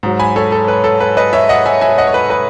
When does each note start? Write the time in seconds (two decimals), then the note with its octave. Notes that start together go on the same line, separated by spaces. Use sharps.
0.03 G#2 F#3
0.19 G#5 B5
0.36 A4 C#5
0.52 A4
0.68 B4
0.84 A4
1.00 B4
1.17 B4 D#5
1.33 C#5 E5
1.49 D#5 F#5
1.65 E5 G#5
1.81 E5 G#5
1.98 D#5 F#5
2.07 C#5
2.14 B4
2.30 B4